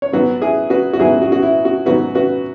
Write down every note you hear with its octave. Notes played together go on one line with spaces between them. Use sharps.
C#5
G#2 F#3 B3 F#4 B4
E4 G#4
F#4 B4
F#4
G#2 F#3 B3 E4 G#4
F#4
F#4
E4
F#4
G#2 F#3 B3 F#4 B4
F#4 B4